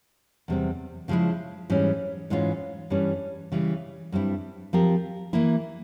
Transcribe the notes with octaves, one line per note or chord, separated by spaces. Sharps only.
E2 C3 G3 C4
C#3 F3 G#3 E4
G#2 E3 G3 C#4
G#2 E3 G#3 C#4 F4
G2 E3 G3 C#4
C#3 E3 G3
G2 G3 C4 E4
F3 C4 G4 A#4
E3 A#3 E4